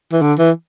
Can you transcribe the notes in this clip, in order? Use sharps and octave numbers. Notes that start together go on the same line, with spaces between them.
E3
D3
E3